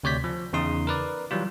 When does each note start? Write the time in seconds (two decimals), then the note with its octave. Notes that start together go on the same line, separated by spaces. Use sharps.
0.03 D2 C3 C#5 D5 G6 B6
0.24 F3
0.53 E2 C#3 D#4 C6 D#6
0.87 A#4 B4 D5
1.31 E3 F#3 G3 F4